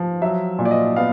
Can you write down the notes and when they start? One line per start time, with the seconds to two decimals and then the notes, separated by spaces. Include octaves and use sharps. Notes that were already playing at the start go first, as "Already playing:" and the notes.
Already playing: F3
0.22 F#3 E5
0.59 A#2
0.65 D5
0.71 D#5
0.96 B3 F5